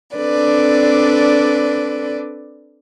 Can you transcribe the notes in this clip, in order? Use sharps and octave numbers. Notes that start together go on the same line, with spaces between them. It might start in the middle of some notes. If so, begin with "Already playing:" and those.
C4 D4 A4 B4 D5